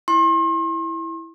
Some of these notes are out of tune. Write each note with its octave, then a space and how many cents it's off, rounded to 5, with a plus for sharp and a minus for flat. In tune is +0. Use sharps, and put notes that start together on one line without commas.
E4 +0 C6 +40